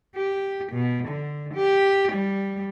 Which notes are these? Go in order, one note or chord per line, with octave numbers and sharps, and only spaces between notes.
G4
B2
D3
G4
G3